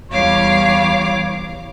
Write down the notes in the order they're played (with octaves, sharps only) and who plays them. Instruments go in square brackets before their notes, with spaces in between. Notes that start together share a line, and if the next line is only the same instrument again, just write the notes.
[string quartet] E2 G3 C#5 F5 D6